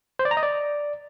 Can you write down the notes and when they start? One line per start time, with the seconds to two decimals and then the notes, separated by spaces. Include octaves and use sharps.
0.19 C5
0.25 D5
0.31 A#5
0.37 D#5
0.43 D5